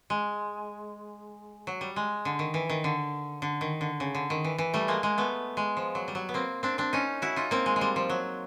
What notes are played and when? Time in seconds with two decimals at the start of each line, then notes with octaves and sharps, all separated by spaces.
0.10 G#3
1.67 F#3
1.81 G3
1.96 G#3
2.25 D3
2.39 D#3
2.54 E3
2.69 D#3
2.84 D3
3.42 D3
3.61 D#3
3.81 D3
4.00 C#3
4.15 D3
4.30 D#3
4.44 E3
4.58 E3
4.74 G3 A3
4.88 G#3 A#3
5.03 G#3 A#3
5.18 A3 B3
5.57 G#3
5.77 F3
5.95 F#3
6.08 G3
6.15 F#3
6.29 B3
6.34 A#3 C4
6.63 C4 D4
6.78 C4 D4
6.93 C#4 D#4
7.22 E4 F#4
7.36 D#4 F4
7.51 A#3 C4
7.66 G#3
7.76 G#3
7.81 G3
7.96 F3
8.09 F#3